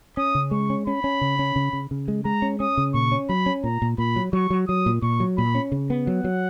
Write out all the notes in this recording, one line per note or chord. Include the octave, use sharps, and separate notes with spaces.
C#4 D#6
C#3
G#3 C#6
C#4
C#4 B5
C#4
C#3
C#4
C#3
C#3
C#3
G#3
G#3 A#5
C#4
C#4 D#6
C#3
A#2 C#6
C#4
F#3 B5
C#4
A#2 A#5
A#2
A#2 B5
F#3
F#3 C#6
F#3
F#3 D#6
A#2
A#2 C#6
F#3
A#2 B5
C#4
C#3
B3
F#3 F#5
F#3